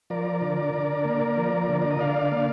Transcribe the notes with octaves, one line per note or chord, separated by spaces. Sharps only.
F3 A#4 D5
D3
D3
A#3
F3
D3
D5
D#5
D3 D5 F5
A#3